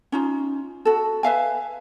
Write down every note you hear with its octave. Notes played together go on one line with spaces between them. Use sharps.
C#4 D#4 F4
F#4 A4
B4 E5 F5 G#5